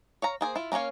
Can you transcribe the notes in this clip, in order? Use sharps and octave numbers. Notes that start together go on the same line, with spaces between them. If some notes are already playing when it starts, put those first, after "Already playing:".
C#5 F5 A#5
A#3 G#4 C5
E4 F4
A#3 C#4 F#4 C#5 F5